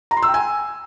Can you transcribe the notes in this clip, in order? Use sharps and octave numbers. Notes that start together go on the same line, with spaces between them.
A#5
C6
E6
G5
G#5